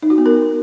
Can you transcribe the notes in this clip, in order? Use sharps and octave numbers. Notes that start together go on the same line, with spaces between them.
D#4
F#4
B3
A#4